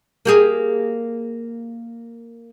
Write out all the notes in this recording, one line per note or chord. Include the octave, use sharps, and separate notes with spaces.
A#3 G4 G#4